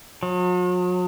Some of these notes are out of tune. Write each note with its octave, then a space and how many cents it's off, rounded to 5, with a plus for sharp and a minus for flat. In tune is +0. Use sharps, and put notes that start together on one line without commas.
F#3 -45